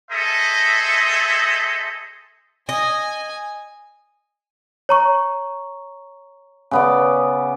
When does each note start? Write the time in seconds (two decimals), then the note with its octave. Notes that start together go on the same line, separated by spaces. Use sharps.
0.11 G#4 A4 C5 D#5 E5
2.69 D#5 G#5
4.89 C#5 A#5 C#6
6.71 C#3 B3 D5